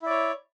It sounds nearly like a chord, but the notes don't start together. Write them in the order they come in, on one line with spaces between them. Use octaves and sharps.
E4 D5 C#5